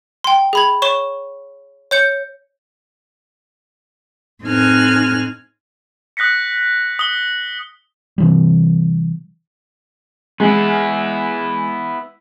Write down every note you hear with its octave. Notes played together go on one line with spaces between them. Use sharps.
G5 C6
G#4 B5 G#6
C#5 C#6 E7 G7
C#5 G6 C#7
A2 C4 D#4 G#5 F6 F#6
D#6 F#6 A#6 B6 C#7
D#6 G7
C3 E3 G3
G#3 B3 E4